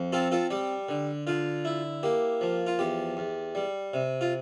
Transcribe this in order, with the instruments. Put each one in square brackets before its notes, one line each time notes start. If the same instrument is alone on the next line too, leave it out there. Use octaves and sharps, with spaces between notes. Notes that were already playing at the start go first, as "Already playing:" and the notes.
Already playing: [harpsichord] F2
C4 F4 A4
F4 A4
G3 G4
D3
D3 F4
E4
A#3 G4
F3
F4
E2 G4
E2
G3
C3
F4